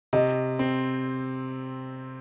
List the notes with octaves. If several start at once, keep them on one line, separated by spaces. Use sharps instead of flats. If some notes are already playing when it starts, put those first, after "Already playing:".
C3 D#5
C4